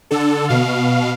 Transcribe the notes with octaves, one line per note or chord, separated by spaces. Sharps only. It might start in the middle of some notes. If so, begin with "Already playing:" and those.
D3 A4
B2 F5